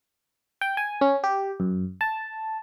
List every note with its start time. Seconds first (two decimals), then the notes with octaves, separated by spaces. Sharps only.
0.61 G5
0.77 G#5
1.01 C#4
1.24 G4
1.60 F#2
2.01 A5